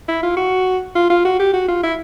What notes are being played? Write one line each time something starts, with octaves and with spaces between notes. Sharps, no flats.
E4
F4
F#4
F4
F4
F#4
G4
F#4
F4
E4